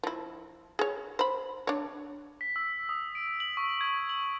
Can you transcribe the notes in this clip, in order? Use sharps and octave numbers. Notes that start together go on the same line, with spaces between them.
F3 E4
G#4 C#5
C5 B5
D4 C#5
B6
E6
D#6
D7
F#7
C#6
G#6
F#7